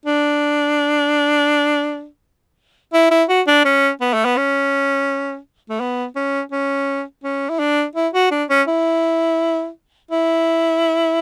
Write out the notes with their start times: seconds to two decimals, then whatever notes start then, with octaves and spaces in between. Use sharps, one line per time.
0.06 D4
2.93 E4
3.11 E4
3.29 F#4
3.47 D4
3.65 C#4
4.01 B3
4.14 A3
4.25 B3
4.37 C#4
5.69 A3
5.80 B3
6.16 C#4
6.52 C#4
7.24 C#4
7.49 E4
7.59 D4
7.95 E4
8.14 F#4
8.31 D4
8.50 C#4
8.68 E4
10.11 E4